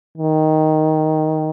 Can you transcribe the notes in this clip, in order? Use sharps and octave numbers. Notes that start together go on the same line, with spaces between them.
D#3